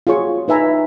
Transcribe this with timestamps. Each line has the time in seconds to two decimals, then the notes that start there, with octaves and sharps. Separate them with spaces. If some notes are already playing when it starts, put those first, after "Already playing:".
0.07 F4 F#4 G#4 C#5 C#6
0.48 D#4 B4 E5 G#5 A#5